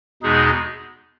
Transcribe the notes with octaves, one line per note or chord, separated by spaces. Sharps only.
E2 B2 G#3 D#4 G#4